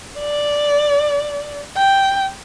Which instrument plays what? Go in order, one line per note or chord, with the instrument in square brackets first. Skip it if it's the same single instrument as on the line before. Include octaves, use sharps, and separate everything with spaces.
[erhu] D5
G5